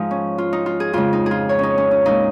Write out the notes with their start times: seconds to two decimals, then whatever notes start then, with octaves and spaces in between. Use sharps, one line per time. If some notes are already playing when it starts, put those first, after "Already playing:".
Already playing: G#2 F3 G#3 D#4
0.11 C#4
0.38 F4
0.53 D#4
0.66 F4
0.80 G#4
0.93 F2 C#3 G#3 F4
1.13 D#4
1.26 G#4
1.31 F4
1.49 C#5
1.59 C#4 D#4
1.78 C#4
1.91 C#4
2.05 A#2 G#3 D#4